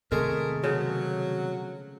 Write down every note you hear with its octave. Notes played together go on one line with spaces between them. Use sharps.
C3 D#3 G#3 A3 B3 G#4 A#4
C#3 F3 F#3